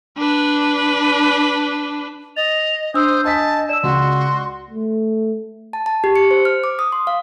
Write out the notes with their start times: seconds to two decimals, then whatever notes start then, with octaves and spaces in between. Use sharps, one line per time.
0.18 D4 B4
2.37 D#5 A6 F7
2.94 D4 C5 D#6 E6 G6
3.25 D#5 G#5 A5 D#6 B6
3.69 D5 E6 E7
3.83 C#2 F#4 C6
4.70 A3
5.73 A5
5.86 A5
6.04 G4
6.16 C#7
6.31 C5
6.45 F6
6.64 D6
6.79 D#6
6.92 C6
7.07 F5